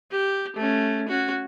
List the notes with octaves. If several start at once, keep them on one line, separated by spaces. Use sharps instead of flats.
G4
A3 C#4
C#4 F#4